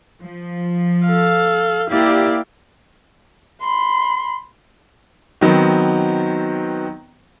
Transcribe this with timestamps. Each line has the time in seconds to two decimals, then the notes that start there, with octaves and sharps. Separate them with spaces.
0.22 F3
1.06 A4 F5
1.90 A#3 E4 G4 D5 F5
3.61 B5 C6
5.41 D#3 F#3 B3 C4